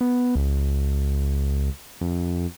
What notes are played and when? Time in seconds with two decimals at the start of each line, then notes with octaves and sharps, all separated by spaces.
0.01 B3
0.35 C#2
2.01 F2